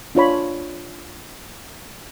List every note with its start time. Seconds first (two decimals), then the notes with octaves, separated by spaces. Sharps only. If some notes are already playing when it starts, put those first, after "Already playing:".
0.15 D4 F4 C#5 B5